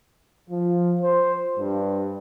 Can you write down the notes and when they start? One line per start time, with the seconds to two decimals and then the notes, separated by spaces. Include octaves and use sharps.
0.50 F3
1.02 C5
1.58 G2